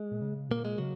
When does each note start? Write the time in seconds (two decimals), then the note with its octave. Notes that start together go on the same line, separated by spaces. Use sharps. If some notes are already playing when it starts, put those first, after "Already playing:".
Already playing: G#3
0.11 A#2
0.21 C#3
0.49 A#2 A#3
0.65 G#3
0.78 C#3 F#3